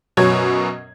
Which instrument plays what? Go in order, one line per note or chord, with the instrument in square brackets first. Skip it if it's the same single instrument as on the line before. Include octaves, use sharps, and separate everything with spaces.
[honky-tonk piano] F#2 B2 F#3 C#5 G#6